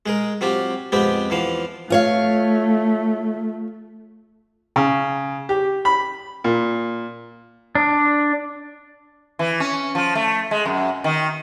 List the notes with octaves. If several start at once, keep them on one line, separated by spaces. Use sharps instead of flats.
G#3 G#4 A#4
F#3 C4 F4 G4
F2 G#3 B3 C4 G4 G5
E2 E3 F3 F5
A3 F4 C#5 F5
C#3
G4
B5
A#2
D4
E3
C#4
F3
A3
G#3
F#2
D#3